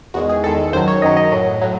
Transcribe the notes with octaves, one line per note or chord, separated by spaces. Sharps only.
E2 D#3 G#3 F#4
G#4
E2 D#3 G#3 A4
F#2 D#3 F#3 C5
C#5
F#2 D#3 F#3 D#5
D#5
A2 F#3
A2 F#3